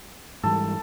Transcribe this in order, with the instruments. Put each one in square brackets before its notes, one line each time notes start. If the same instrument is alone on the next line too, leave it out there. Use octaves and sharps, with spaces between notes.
[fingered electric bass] G#2 E3 G3 [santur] A4